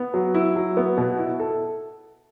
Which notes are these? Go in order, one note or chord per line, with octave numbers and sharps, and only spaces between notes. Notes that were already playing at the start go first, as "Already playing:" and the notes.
Already playing: B3
F#3
E4
F#3
B3
B2
E4
A4